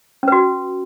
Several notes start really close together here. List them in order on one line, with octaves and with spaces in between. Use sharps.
C#4 B4 F#4